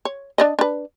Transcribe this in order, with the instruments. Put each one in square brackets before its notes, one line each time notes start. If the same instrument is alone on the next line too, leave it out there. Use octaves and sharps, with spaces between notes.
[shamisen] C#5
D4 D5 D#5
D4 B4